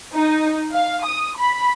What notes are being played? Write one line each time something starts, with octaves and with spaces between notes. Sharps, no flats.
D#4
F5
D#6
B5